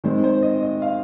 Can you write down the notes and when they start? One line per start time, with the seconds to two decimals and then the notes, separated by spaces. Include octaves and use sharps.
0.04 D#3 G#3 C4 C5
0.24 C5
0.42 D#5
0.63 D#5
0.82 F5